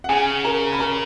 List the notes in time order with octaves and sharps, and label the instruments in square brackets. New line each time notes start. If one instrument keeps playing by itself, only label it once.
[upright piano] F#5
[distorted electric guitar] C#3 [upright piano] G#4 G#5
[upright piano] A#4 A#5
B5
A#4 A#5